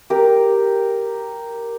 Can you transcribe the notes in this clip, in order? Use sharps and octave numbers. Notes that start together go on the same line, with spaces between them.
G4 A#4